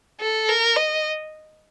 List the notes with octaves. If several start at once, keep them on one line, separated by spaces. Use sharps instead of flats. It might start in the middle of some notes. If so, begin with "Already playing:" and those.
A4
A#4
D#5